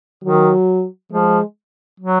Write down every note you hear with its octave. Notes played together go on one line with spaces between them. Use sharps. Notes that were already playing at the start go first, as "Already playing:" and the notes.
D#3 F#3
F3 G#3
F#3